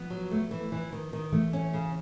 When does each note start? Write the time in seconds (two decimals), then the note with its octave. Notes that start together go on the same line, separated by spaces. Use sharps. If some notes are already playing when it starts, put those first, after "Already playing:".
Already playing: F3 B3
0.10 F#3
0.31 A3
0.51 E3
0.72 E3
0.93 D#3
1.13 D#3
1.32 E3 A3
1.53 C#4
1.73 C#3